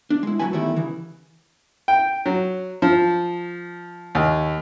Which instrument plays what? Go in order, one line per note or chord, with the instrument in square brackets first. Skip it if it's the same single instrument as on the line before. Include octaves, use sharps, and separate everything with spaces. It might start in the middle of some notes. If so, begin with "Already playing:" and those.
[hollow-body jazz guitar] D4
G#3 E4
A2 F#3 A#3 F#4 B4 G#5
E2 D#3 G3 A3 E4
C#3 E3
[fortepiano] G5
F#3
F3
D#2